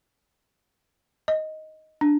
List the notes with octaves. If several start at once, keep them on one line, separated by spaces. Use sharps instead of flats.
D#5
D4